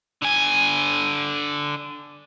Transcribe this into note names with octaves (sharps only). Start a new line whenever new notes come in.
D3 G#5